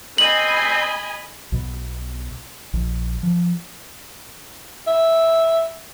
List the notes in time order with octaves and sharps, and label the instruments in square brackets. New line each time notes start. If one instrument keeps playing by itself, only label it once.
[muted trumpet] C4 [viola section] D#5 G#5 B5 [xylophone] F#7
[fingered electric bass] B1 B2
A#1
F3
[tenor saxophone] E5